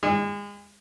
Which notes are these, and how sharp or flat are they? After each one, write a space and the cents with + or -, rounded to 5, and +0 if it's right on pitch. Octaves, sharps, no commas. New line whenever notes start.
G#3 -35